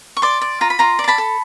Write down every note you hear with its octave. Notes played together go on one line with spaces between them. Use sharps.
C#6
D5 C6 D6
D5
F4 A#5
B5
F4 A#5 C6
D5
C6
A5 B5
A4